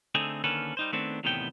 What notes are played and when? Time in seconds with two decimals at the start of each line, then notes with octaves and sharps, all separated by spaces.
0.15 D3 A3 C4 D#4 G#4
0.44 D3 D#3 A#3 C#4 A4 B4
0.77 G3 D#4 C5
0.92 D#3 A3 B3 C4 D4
1.24 E2 A2 C3 D#3 B3 G5